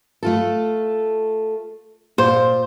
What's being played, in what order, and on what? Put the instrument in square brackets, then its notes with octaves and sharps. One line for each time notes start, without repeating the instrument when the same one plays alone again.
[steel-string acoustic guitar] A3 F4 A4
[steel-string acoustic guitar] A#2 [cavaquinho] C5